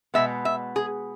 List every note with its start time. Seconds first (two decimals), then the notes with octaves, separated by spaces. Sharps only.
0.14 B2 G#3 B3 E5
0.45 E5
0.76 G#4